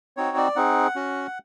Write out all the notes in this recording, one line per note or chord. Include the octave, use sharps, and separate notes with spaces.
C4 D#4 F#4 C#5
D5
C4 D#4 G#4 F#5
C#4 F#4